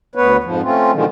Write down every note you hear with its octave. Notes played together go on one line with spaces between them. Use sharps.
D2 B3 B4 C#5
F2 G#2 F3
A3 C4 C#4 F4
B2 D3 D#3 F3 G#3